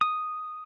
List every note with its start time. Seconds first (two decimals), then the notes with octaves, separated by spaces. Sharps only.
0.01 D#6